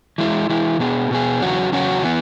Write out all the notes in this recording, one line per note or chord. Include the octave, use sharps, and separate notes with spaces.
E3 G#3 E4
E3 G#3 E4
B2 B3 G#4
B2 B3 G#4
E2 C#3 F#3 C#4 F#4
E2 C#3 F#3 C#4 F#4
E3 B3